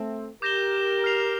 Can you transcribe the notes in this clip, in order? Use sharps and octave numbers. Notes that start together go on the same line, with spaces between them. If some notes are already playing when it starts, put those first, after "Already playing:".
Already playing: A3 C4
G4 A#4 D6 G6 A#6 E7 G7
F6 C7 F7